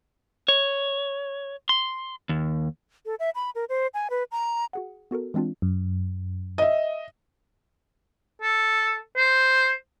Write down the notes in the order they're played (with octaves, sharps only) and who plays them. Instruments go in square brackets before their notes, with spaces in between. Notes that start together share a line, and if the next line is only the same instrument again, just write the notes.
[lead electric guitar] C#5
C6
D#2
[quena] A4
E5
B5
A#4
C5
G#5
B4
A#5
[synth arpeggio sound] F#4 G#4 F#5
B3 F#4 A4 A#4
E3 G#3 C4 D4 F4
[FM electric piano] F#2
[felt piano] D#5 E5
[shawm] A4
C5